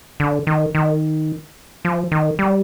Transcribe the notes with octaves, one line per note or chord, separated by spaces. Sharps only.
D3
D#3
D#3
F3
D#3
G3